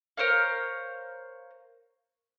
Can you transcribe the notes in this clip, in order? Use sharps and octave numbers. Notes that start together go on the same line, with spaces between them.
A#4 C5 C#5 F5